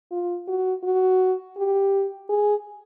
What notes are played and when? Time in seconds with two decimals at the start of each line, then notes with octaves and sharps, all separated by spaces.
0.11 F4
0.48 F#4
0.84 F#4
1.57 G4
2.29 G#4